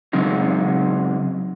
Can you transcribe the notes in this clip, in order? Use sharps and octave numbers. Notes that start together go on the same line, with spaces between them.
C#3 F#3 G#3 C4 D#4